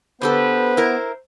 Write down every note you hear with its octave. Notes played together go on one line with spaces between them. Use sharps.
D3 B3 G4 A4 B4 C5
E4 A#4